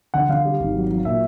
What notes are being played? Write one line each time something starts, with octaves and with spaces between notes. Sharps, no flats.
D3 F#5
D3 F5
G3
G#1
F#3
F#3
A#2 E5